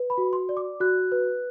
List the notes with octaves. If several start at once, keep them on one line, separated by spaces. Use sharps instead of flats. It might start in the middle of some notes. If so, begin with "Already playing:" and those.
Already playing: B4
B5
F#4
C6
D5
D6
F#4 F#6
B4